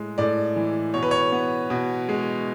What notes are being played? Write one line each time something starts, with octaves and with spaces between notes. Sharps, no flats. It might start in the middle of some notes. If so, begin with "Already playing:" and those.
Already playing: A2 G#3
A2 D5
E3
B2 C#5
B4
C#5
B3
B2
G#3